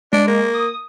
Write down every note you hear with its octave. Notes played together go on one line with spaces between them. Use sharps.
G#3 D4
A#3
D#6